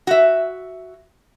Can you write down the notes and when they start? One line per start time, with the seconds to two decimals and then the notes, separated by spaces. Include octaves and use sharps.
0.07 F#4 E5